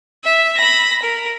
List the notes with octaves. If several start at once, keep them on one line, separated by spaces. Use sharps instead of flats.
E5
B5 A#6
A#4